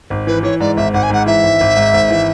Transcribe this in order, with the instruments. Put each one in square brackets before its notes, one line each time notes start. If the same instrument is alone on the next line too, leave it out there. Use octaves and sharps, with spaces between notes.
[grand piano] G#1
[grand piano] E3 [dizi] B4
[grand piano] E3 [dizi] C#5
[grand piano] G#2 [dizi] D5
[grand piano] G#1 [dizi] E5
[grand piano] G#1 [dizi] F#5
[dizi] G#5
[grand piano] G#2 [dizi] F#5
[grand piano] E3 [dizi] E5
[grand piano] G#1
G#1
G#2
G#1
E3